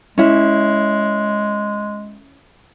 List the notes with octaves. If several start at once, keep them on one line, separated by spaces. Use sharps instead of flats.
G#3 C#4 E4